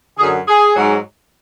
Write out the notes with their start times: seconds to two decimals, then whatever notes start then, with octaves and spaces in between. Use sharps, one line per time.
0.19 F#2 D3 F#3 G#4
0.48 G#4
0.76 G#2 F#3